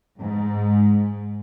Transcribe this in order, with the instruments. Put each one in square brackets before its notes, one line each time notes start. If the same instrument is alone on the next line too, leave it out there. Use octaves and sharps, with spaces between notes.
[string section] G#2